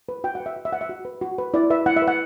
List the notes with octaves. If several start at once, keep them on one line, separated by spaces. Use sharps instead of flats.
B4
F#4 G5
F#5
B4
E5
F#4
E5
B4 F#5
E5
F#4
B4
F#4
B4
E4 D5
B4 E5
E4 F#5
E5
B4
F#5